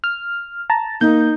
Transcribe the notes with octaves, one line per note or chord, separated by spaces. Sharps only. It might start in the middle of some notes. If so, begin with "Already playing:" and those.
F6
A5 A#5
A#3 D#4 G6